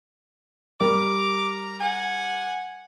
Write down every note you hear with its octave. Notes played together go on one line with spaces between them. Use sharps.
G3 G4 A#4 A#5 D6
F#5 G#5